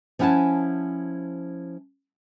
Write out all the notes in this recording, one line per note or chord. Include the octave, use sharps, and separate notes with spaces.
F3 C#4 E4 F#5 G#5 A5